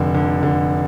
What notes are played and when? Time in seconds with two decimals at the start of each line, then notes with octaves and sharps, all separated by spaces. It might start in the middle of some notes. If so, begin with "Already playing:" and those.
Already playing: F1 D3
0.14 D3
0.43 D3